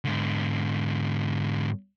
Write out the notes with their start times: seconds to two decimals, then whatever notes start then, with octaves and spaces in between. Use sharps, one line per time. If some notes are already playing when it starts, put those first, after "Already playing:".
0.05 G#2 D3